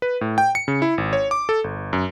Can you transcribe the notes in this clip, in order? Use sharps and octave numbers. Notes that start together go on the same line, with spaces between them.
B4
A2
G5
C#7
C#3
E4
G#1
C#5
D6
A4
G1
F#2